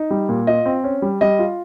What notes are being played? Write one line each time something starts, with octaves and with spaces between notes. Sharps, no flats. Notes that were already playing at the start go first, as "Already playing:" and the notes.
Already playing: D#4
G3
A#2
F4 D#5
C4
C#4
G3
G3 D#5
F4